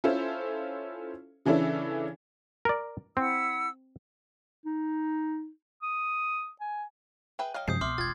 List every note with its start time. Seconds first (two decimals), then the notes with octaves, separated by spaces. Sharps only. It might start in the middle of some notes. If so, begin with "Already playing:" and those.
0.04 C#4 E4 F4 A4 C5
1.45 C#3 E3 C#4 D4 E4 A4
2.65 A#4 D5
3.17 C4 E4 F#5 E6
4.65 D#4
5.82 D#6
6.61 G#5
7.39 G#4 B4 E5 G5
7.54 F#3 D#5 F5 G5 F6
7.68 F#2 C3 F3 G#3 D#6 G6 C7
7.81 C2 B2 E5 C6 D6 F6
7.98 E1 G3 F4 G#6 A6